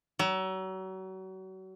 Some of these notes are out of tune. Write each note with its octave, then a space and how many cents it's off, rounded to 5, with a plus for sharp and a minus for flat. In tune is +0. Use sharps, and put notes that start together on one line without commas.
F#3 +35